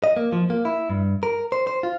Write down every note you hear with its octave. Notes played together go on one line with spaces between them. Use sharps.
D#5
A#3
F3
A#3
E4
G2
A#4
C5
C5
F4